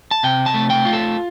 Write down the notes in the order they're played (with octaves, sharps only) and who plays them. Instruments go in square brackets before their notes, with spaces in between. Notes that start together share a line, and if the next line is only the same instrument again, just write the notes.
[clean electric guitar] A5
C3 G5
A5
A3
G5
F4
A4